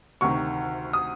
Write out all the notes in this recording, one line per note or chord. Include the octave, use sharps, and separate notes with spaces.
D2 C3 D#3 C#6
D#6